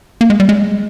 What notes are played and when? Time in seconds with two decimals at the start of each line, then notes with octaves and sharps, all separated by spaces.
0.21 A#3
0.30 G#3
0.40 G3
0.49 G#3